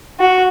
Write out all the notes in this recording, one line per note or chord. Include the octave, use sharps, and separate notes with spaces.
F#4